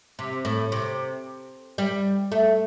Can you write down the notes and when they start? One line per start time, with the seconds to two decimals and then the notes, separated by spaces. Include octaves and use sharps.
0.19 C3
0.45 A2
0.72 C3
1.78 G3
2.32 A3